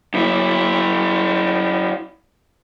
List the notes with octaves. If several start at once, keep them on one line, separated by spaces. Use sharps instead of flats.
F#2 E4